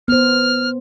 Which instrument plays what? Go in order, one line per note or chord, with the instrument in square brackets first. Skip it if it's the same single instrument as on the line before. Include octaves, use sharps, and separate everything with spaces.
[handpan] B3 C5 [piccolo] F6